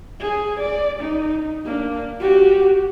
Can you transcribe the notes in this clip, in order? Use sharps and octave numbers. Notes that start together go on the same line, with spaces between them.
G#4
D5
D#4
A#3 D4
F#4 G4